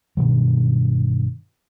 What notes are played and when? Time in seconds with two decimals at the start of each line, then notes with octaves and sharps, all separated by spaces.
0.17 G2 B2 D#3 F#3